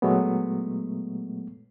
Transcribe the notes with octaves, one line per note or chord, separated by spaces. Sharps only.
A#2 F#3 G#3 A3 B3